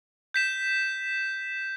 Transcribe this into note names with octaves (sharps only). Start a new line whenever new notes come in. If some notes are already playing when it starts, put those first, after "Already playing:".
G6 B6 E7